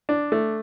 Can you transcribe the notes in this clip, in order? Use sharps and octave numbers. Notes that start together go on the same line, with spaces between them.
D4
A3